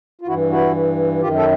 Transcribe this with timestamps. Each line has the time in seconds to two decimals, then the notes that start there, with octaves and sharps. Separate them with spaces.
0.21 F4
0.27 G2 E3 E4 F#4
0.51 E4 F#4
1.21 F#2 D#3 F4 G4
1.37 A4